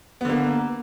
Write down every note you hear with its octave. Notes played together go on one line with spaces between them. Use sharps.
D3 A#3 B3